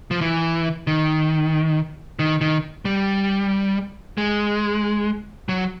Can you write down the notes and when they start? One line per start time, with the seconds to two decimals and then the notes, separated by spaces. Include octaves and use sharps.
0.11 F3
0.21 E3
0.87 D#3
2.19 D#3
2.41 D#3
2.85 G3
4.18 G#3
5.49 F#3